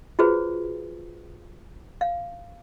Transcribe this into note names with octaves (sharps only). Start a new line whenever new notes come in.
F4 F#4 G#4 B4 C5
F5